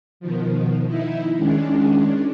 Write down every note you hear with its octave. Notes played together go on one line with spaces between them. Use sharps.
B2 D#3 F3
D#4 E4
D#3 G#3 C#4 D4